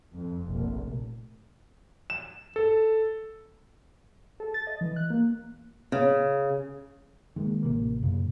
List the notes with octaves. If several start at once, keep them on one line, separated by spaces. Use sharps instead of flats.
F2
F1 A#1
E7
A4
A4
A6
D#5
E3
F#6
A#3
C#3
D#3 G#3 A#3
A1 C3 A#3
F#2 A#2 C#3